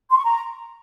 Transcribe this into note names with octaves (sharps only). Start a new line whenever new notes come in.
C6
C#6
A#5